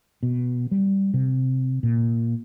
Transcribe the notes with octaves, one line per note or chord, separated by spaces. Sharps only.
B2
G3
C3
A#2